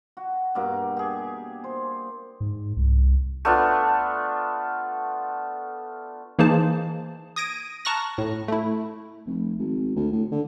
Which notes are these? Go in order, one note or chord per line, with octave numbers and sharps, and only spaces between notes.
F#4
G2 B2 A#3 D6
G4 G#4
C5
G#2
C2
A3 B3 D4 F4
E3 A#3 D#4 G#4 C5 A5
D#6 G#6 A#6 D7 D#7
A5 A#5 C#6 F6 F#6 A#6
A2
A3 E4
F1
G#1
D2
A2
D3